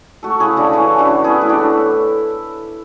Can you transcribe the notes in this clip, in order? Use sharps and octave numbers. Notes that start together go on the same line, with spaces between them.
A3 F#4 A4
C#3 E4 G#4
C#3 D4 F#4
E3 C#4 E4
A3
D4 F#4
C#3
B3 E4 G#4
A2
D4 F#4
A2